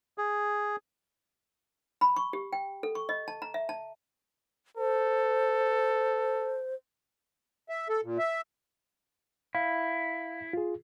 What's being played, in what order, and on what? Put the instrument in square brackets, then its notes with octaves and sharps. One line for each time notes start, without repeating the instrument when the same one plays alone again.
[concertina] G#4
[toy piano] B5
C#6
G4
G5
A4
C#6
D#5
A5
A#5
E5
A5
[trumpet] A4 [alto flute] C5
[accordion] E5
A4
A#2
E5
[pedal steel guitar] E4 [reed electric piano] F5
[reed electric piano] F4 G#4